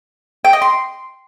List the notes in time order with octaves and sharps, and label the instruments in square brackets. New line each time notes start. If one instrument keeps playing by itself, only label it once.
[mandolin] G5
D#5
C6